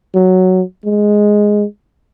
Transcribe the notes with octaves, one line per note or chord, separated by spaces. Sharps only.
F#3
G#3